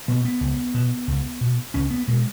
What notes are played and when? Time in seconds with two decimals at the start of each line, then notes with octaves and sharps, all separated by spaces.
0.08 B2 B3
0.25 B3
0.41 C#2
0.74 B2
1.08 C#2
1.41 B2
1.74 C#2 C#4
1.91 B3
2.08 B2 G#3